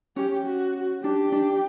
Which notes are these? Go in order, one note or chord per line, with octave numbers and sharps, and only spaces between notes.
C#4 G4
F#4
D4 G4
D4